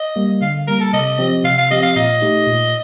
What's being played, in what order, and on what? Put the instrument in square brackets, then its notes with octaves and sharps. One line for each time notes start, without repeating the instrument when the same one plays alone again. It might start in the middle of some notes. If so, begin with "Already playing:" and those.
Already playing: [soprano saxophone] D#5
[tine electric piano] G3 A#3
[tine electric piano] D3 [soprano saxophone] F5
[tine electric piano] G3 A#3 [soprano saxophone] A#4
[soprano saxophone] A4
[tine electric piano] C3 [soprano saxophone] D#5
[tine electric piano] F3 C4 G4
[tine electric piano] C3 [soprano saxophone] F5
[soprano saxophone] F5
[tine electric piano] F3 C4 G4 [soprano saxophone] D#5
[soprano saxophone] F5
[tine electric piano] A#2 [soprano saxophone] D#5
[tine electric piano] A3 D#4 G4
A#2